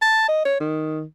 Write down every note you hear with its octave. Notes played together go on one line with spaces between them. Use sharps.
A5
D#5
C#5
D#3